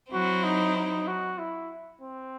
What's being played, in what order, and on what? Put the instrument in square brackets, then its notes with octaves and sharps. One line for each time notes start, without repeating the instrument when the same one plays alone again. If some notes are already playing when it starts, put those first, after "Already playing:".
[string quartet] F#3 C4 E4 [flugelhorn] F#4
[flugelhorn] D#4
D#4
F#4
E4
C4